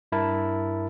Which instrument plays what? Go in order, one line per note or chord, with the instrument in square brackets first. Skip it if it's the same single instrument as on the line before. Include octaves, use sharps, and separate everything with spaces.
[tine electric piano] G2 E4 A#4 A5